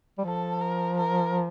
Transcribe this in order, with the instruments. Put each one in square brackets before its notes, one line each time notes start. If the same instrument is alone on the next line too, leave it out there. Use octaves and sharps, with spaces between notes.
[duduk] G3
[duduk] F3 [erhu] A4
[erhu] A#4
A#4